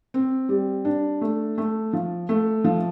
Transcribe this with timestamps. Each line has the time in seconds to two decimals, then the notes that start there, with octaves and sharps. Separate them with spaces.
0.14 C4
0.49 G3
0.85 D4
1.21 A3
1.58 A3
1.93 F3
2.29 A3
2.64 F3